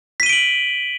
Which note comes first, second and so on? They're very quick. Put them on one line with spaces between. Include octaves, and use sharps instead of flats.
B6 D#7 G7 D7 F#7